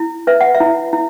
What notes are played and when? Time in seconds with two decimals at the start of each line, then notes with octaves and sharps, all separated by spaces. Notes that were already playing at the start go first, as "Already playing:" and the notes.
Already playing: E4
0.27 B4 E5
0.41 F#5
0.55 E5
0.60 E4
0.93 E4